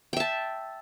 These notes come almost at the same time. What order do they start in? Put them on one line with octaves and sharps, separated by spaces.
G5 E5 A5